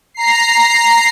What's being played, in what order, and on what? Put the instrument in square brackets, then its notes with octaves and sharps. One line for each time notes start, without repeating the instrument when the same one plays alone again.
[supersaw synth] A#5 C7